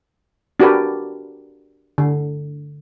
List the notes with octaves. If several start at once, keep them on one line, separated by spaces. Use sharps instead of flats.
D4 F#4 G4 A#4 B4
D3